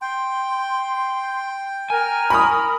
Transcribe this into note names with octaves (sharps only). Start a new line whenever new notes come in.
G5 C6
A#4 G#5 A#5 F6
B5 C#6 D#6